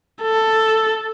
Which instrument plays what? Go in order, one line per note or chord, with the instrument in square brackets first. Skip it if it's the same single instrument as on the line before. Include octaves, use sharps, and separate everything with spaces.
[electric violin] A4